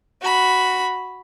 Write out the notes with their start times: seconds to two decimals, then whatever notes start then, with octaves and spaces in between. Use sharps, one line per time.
0.22 F#4 B5